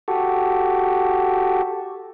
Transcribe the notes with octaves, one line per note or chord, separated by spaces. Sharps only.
F#4 G4 A4